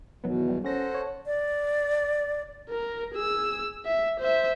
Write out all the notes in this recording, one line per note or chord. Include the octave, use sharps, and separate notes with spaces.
E2 B2 D#3 F#3 B3
G3
C#4 A4 C5 F#5 A#6
C#5
D5
A#4
G#4 E6
E5
C5 E5